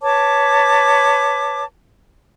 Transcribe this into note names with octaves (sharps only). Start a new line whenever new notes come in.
B4 C#5 A5 D6